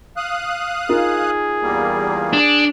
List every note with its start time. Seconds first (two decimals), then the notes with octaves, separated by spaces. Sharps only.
0.17 F5 D#6 F#6
0.89 D#4 F4 G#4 A#4
1.62 E2 G3 A#3
2.33 D4